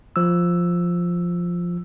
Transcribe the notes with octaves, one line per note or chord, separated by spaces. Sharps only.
F3 E6